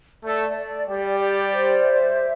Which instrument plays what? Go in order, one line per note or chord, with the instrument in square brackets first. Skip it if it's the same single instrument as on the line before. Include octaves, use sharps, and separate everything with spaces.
[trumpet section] A3 A4 [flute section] D5
[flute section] D5
[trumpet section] G3 G4 [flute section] D5
[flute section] D5
C5
E5